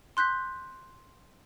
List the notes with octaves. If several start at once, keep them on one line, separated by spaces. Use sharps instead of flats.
C6 F#6 G6 B6